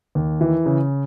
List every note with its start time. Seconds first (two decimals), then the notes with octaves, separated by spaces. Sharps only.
0.15 D#2
0.41 E3
0.66 C#3